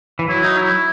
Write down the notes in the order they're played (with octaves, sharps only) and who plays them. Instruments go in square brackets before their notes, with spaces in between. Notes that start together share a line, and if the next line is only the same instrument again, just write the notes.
[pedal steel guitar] E3
[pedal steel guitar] F#3 [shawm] E4
[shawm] D#4
E4